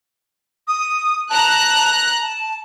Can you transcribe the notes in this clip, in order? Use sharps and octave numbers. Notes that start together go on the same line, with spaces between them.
D#6
A5 A#5 F#6
A5